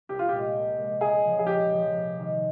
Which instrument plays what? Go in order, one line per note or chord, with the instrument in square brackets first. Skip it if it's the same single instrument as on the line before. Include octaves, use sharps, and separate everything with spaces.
[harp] C2 [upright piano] G4
[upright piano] F4
[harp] A#2 G#3 [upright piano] G4
[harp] C2
A#2 G#3
[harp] C#2 [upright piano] G#4
[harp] C#3 F3
[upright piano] G#4
[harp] C#2 [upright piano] G4
[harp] C#3 F3
C3
D#3 G#3